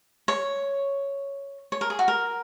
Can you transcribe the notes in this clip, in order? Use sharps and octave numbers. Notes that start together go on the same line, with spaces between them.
C#5
C#5
A#4
G#4
F#4
A#4